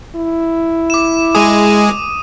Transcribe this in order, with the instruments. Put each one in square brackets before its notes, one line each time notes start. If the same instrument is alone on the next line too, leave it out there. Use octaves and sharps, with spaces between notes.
[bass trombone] E4
[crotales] D6 E7
[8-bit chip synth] G#3 G#4 [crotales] D#6 D#7